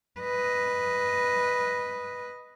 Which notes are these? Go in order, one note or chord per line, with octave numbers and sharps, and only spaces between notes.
B4 D#5